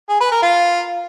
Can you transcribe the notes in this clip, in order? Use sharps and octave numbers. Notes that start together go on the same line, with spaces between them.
G#4
B4
A#4
F4